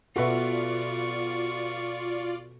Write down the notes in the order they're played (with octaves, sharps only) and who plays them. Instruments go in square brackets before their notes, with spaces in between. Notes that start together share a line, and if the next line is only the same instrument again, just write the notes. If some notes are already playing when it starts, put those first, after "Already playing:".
[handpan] B2 A4 [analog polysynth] F4 D5 [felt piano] F#4 B4 E5 [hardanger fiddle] C#6